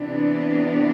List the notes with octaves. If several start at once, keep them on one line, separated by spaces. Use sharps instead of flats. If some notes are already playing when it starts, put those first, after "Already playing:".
Already playing: C3 E3 B3 D4